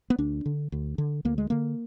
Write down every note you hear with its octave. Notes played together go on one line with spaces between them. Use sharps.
B3
D2 D4
D3
D2
D3
D2 A#3
G#3
D3 A#3